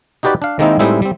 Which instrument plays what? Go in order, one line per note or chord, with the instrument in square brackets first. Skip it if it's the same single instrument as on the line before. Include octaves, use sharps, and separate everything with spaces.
[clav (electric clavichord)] D#4 F#4 G4 B4 D5
D4 F5
D#3 G#3 A#3 C4 D#4 E4
A2 G3 G#3 C4 D#4 E4
G3 C4